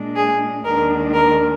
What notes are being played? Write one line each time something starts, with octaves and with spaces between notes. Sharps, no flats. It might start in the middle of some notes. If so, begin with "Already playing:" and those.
Already playing: A#2 G#3 D4
G#4
D#2 D#3 G#3 D4 A#4
A#4